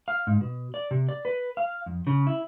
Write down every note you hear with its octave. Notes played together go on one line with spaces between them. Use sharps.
F5
G#2
B2
D5
C3
D5
B4
F5
F2
C#3
E4